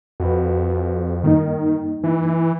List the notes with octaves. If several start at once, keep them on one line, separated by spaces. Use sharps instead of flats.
F2 F#4 B4
G2 D#3 A#3 D#4
E3